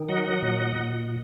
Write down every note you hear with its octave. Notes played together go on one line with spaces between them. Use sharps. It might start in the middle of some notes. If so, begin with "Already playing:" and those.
Already playing: D#3
F#3 D#5 F#5
D#5 F#5
A#2
A#2